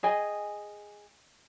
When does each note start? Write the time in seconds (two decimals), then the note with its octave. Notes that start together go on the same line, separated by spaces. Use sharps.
0.03 G#4 D#5 G5 G#5